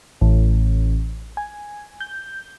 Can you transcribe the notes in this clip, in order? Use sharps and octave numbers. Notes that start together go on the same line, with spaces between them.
A1
G#5
G6